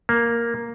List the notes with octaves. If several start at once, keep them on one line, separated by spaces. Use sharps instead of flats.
A#3